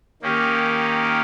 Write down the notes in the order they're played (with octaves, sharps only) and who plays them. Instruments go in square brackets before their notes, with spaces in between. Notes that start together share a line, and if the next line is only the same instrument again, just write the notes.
[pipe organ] D#3 A#3 C#4 G4